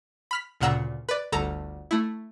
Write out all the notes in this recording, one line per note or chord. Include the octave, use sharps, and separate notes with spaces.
B5 F6 B6
D2 A#2 C#3 F#5 A#5 E6
B4 D5
G1 D2 A4 A#5
A3 E4